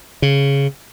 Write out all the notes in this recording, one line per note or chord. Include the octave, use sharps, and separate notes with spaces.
C#3